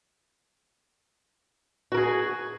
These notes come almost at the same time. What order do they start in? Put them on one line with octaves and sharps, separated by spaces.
F#4 A#4 G#4